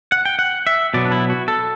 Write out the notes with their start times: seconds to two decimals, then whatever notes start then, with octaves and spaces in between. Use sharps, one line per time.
0.12 F#5
0.25 G5
0.39 F#5
0.67 E5
0.94 B2 F#3 B3 D5
1.05 D4
1.11 E4
1.30 F#4
1.48 A4